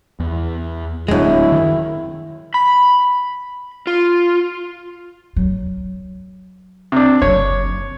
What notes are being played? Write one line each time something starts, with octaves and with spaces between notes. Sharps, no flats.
E2
D1 F#2 G#3 D4 E4
D#3
B5
F4
F#3
C3 D4
F#1 F#3 C#5